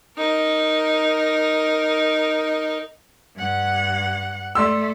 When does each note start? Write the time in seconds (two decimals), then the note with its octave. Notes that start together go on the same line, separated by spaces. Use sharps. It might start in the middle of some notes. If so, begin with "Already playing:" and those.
0.17 D#4 A#4
3.36 G2 F#5
4.55 A3 D5 C6 E6